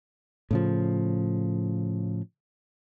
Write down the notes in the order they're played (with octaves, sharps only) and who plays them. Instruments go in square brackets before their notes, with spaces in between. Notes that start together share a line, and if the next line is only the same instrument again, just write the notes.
[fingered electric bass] A2 C#3 F3